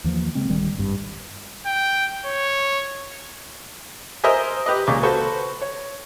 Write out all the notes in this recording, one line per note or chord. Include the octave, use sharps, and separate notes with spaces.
D#2 E3 F3 A#3
C#3 G#3 C4
D1 D#3 G3
G#1 G2
G5
C#5
A#4 C5 D#5 E5 G#5
G4 B4 D#5
C#2 A#2 G#3 C#6 D6
F#4 A4 B4 C5 C#6
C#5